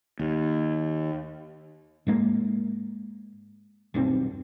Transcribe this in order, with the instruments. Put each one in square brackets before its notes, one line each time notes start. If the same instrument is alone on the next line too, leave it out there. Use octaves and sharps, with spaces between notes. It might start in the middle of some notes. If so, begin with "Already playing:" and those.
[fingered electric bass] D#2
[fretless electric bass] G#2 G#3 A#3
D#1 B1 G2 C4